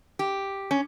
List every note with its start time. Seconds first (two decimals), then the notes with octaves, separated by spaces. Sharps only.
0.19 G4
0.71 C#4